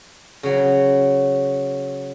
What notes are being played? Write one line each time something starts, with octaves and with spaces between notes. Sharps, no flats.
C#3 F#3